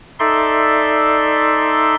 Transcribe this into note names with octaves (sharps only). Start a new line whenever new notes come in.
D#4 A4 D5 E5 C6